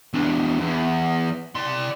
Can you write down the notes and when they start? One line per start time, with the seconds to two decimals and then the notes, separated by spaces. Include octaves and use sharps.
0.14 E2 D4
0.60 E2
1.55 D5 C6